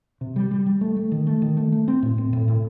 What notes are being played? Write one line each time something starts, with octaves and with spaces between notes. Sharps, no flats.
C3
G3
G3
G3
A3
A3
D#3
A3
D#3
A3
A3
C4
A2
C4
A2
A2